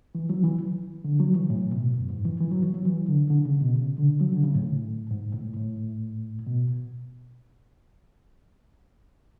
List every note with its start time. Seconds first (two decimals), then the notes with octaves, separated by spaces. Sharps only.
0.15 E3
0.30 F#3
0.44 E3
1.05 D3
1.20 F#3
1.35 E3
1.50 A2
1.72 B2
1.94 F#2
2.10 G#2
2.25 E3
2.40 E3
2.52 F#3
2.63 E3
2.74 F#3
2.85 E3
3.08 D3
3.30 D3
3.45 C#3
3.61 B2
3.75 C#3
3.98 D3
4.21 F#3
4.33 D3
4.43 C#3
4.55 A2
5.11 G#2
5.34 A2
5.57 A2
6.47 B2